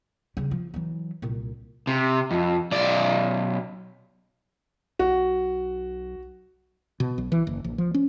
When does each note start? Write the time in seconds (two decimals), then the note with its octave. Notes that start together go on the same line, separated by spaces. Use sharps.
0.37 C#3 G3
0.51 F3
0.74 E3 F#3
1.22 C2 A#2
1.87 C3
2.31 F2
2.71 B1 D5
4.99 B1 F#4
7.00 B2
7.18 B1
7.32 E3
7.47 F#1
7.64 A#1
7.78 F3
7.94 C#4